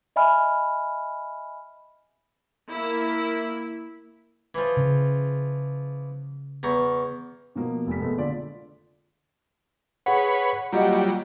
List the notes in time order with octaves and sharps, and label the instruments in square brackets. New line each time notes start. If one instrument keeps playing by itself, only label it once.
[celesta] D#5 E5 G#5 B5 F6
[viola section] A#3 E4
[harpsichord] E3 F3
[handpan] C#3
[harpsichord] E2 A#5 C#6
[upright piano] B2 F3 A#3
F1 B6
A#2 G#3 A3 B3
D3 F4 D5
[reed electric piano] G#4 F#5 [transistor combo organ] B4 C#5
[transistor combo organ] F#3 G3 [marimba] A#3 D#5 F#5 [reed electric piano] F4 G4